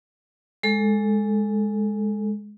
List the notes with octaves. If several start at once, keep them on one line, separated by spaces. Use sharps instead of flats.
G#3 A4